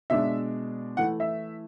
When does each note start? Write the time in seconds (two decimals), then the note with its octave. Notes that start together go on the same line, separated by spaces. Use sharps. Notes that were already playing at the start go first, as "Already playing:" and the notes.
0.10 B2 G#3 D4 E5
0.97 E3 A3 E4 F#5
1.20 E5